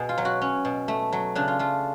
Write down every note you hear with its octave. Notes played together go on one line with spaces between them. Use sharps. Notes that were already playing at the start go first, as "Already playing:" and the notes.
Already playing: B2 B3 G#4
F4
F#3
F#4
C#4
B2
A3
F#3
C#3 D4
F4
A3 F4